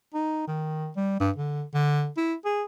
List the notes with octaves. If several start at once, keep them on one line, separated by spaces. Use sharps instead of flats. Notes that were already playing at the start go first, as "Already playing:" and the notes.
D#4
D#3
G3
G2
D3
D3
E4
G#4